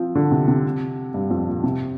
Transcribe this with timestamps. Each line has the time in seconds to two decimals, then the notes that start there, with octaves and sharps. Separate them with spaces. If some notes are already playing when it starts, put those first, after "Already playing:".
Already playing: F3 C4
0.15 D3
0.31 C3
0.48 C3
1.14 G2
1.30 F2
1.47 A#2
1.63 C3